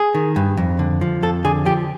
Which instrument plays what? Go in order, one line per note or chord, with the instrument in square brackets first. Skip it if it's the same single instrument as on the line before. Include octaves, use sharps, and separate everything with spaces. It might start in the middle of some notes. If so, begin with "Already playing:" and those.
Already playing: [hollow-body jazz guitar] G#4
D#3
G2
F2
D3
F3
F2 A4
D3 G#4
F3 G4